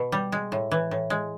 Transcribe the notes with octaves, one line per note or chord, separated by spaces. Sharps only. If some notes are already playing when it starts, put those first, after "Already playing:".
Already playing: B2
G3
G#3
A2
E3
A2
G#3